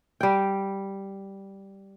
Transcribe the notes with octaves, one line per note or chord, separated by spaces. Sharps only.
G3 G5